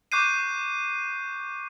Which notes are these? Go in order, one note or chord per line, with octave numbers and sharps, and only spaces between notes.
C#6 D6 F#6 G6 C7 D#7